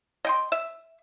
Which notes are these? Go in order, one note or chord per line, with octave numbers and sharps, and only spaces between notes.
D#5 G5 C6
E5